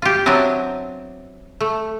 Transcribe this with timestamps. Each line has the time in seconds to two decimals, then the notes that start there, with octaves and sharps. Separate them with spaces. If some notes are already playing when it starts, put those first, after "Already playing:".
0.02 F4 G4
0.26 F#3 B3 C4 D4 E4
1.60 A3